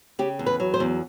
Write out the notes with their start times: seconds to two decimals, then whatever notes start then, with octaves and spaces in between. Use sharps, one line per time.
0.19 C#3 G4
0.39 E2
0.46 B4
0.60 F#3
0.74 C5
0.80 E2